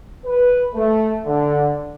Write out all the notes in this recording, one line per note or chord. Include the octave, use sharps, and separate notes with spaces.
B4
A3
D3